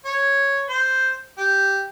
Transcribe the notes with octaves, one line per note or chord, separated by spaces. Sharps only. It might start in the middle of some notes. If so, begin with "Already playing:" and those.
C#5
C5
G4